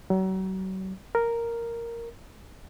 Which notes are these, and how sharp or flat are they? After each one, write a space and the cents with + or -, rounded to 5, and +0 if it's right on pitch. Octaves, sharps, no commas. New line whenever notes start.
F#3 +35
A#4 -5